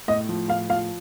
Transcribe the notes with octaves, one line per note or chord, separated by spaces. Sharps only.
A2 D#5
F3
A2 F5
F3 F5